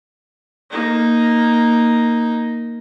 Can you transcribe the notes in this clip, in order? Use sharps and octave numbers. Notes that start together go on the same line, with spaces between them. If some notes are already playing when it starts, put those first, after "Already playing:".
A#3 D#4